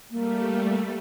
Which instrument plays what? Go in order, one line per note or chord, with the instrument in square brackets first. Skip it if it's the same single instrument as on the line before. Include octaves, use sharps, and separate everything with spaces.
[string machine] G3 A3 [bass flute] A#3